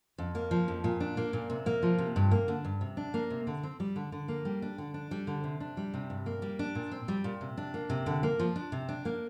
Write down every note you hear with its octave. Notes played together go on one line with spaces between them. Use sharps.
F2
A#3
F3
F2
A#2
D4
A#3
A#2
C3
A#3
F3
C3
G2
A#3
D3
G2
C3
D4
A#3
C3
D3
C4
G3
D3
D3
A#3
G3
D4
D3
D4
G3
D3
C3
D4
G3
C3
G2
A#3
G3
D4
A#2
C4
G3
A#2
C3
D4
A#3
C3
D3
A#3
F3
D4
C3
D4
A#3